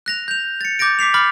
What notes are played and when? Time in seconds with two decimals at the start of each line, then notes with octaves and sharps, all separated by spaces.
0.06 F#6 A#6 F7
0.28 G6 F7
0.61 A6 C#7
0.79 D6 G6 A6 A#6 D7
0.99 D6 B6 C7 F7
1.14 B5 D6 F6 A6 F#7